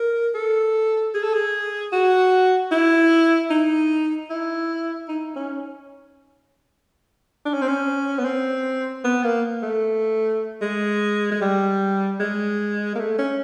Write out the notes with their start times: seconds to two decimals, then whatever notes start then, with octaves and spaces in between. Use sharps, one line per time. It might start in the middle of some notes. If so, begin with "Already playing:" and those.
Already playing: A#4
0.35 A4
1.15 G#4
1.24 A4
1.34 G#4
1.93 F#4
2.72 E4
3.50 D#4
4.30 E4
5.09 D#4
5.36 C#4
7.46 D4
7.54 C#4
7.62 C4
7.68 C#4
8.19 B3
8.25 C4
9.05 B3
9.24 A#3
9.63 A3
10.62 G#3
11.32 G#3
11.42 G3
12.20 G#3
12.96 A#3
13.00 A3
13.19 C#4